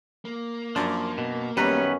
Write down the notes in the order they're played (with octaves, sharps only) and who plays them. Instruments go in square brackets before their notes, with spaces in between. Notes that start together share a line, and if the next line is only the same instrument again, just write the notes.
[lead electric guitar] A#3
[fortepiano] F#2 D4 [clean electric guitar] F3
[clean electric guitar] B2
[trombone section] F#2 B3 C#4 [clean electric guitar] D#3 B4 [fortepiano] G3 A#5